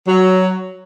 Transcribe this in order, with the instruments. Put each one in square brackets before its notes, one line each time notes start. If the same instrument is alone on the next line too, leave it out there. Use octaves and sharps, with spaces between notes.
[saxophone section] F#3